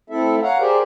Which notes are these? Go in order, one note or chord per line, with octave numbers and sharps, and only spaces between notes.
A3 C4 E4 A4 E5
C#5 F5 F#5 A#5
G4 G#4 A#4 C5 D5